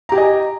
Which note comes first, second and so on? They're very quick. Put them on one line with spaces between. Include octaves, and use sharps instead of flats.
A#5 G4 G#5 D#5